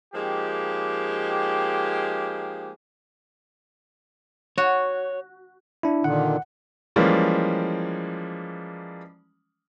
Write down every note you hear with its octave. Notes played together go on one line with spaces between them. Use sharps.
F3 G#3 A#3 D#4 G4
F#4 C#5
D4 E4
A#2 D3 D#3 F#5
E3 F3 G3 G#3 A#3 C#4